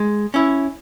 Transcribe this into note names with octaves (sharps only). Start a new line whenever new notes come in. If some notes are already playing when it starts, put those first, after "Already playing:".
Already playing: G#3
C#4 E4